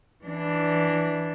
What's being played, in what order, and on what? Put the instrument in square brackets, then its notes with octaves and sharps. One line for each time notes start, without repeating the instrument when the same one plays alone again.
[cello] E3 D4